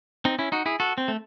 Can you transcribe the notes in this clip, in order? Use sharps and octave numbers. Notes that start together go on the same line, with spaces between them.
C4 D#4
C#4 E4
D#4 F#4
E4 G#4
F#4 A4
C4
A3